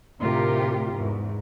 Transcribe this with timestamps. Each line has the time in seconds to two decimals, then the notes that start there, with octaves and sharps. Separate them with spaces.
0.20 D2 A2 C3 F4 G4 A#4
0.93 E2 G#2